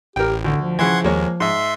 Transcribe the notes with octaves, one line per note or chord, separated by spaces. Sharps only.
A1 G4 A#4 G5
D2 D3
F3
C#3 E3 F#5 C6 G#6
D#2 G#3 A#3 C#5
G#2 E5 C6